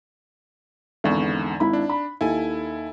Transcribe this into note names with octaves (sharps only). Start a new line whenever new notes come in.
G#1 E2 D3 C#6
G#1 E4 B5
D4
B5
D#2 E4 A4 G#5